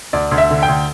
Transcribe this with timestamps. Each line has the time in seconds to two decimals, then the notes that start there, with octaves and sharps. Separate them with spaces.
0.13 D2 D5
0.31 D2
0.38 E5
0.51 D3
0.63 G5
0.69 D2